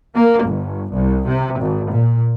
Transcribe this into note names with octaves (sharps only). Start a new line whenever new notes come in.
A#3
G1
C2
C3
G#1
A#2